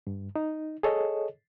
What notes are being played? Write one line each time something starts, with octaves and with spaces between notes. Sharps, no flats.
G2
D#4
G#4 A4 C#5 D#5